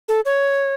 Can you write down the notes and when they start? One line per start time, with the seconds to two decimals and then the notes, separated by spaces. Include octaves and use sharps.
0.08 A4
0.25 C#5